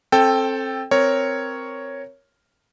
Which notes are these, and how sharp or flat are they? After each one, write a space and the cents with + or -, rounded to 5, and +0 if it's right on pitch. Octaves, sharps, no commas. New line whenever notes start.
C4 +25 A4 +0 G5 +0
C4 +0 A#4 +0 C#5 +0